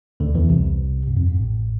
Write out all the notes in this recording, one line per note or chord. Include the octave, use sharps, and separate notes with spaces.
D2 D3
E2 E3
C2 C3
G2
F2
G2
A1 A2